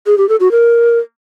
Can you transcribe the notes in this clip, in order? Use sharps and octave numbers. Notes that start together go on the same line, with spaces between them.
G#4
G4
A4
F#4
A#4